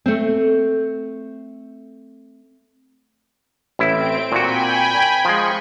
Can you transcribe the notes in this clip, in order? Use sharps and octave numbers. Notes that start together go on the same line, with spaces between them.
A3 C4
A1 C4 E4 D7
A#2 F#4 G5 G#5 B5
F3 G#3 C#6